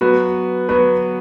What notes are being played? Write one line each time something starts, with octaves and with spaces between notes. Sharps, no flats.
F#3 B3 F#4 B4
F#3 B3 F#4 B4